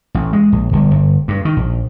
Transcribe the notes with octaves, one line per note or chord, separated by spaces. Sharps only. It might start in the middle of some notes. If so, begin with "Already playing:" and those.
A1
G#3
A#1
G1
G1
G2
D#3
A#1